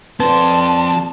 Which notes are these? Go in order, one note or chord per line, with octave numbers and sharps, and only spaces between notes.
F3 C4 B4 D5 A5 C6